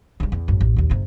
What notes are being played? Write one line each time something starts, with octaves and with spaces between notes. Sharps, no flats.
C#3 G3
E2
G#1 F#2
A1
A#1 D#2
G1 C3